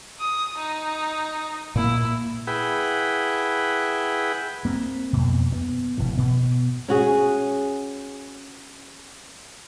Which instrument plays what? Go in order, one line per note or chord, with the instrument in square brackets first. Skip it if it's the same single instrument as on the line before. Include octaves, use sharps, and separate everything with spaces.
[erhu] D#6
D#4
[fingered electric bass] A#2 A#3 [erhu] E4
[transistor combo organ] E4 G#4 B4 F#5 G5
[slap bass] A#3 C4
F2 B2
B3
F1 B2 E3
B2 B3
[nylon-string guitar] C#4 F#4 G#4